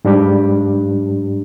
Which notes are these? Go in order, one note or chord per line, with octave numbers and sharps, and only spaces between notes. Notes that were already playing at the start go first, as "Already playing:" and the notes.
G#2 G3 D4 G4